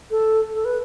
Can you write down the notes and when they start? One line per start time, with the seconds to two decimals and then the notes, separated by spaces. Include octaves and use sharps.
0.11 A4
0.54 A4
0.65 B4